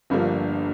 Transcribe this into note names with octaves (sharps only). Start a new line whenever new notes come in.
G1 G2 D3 F3 A#3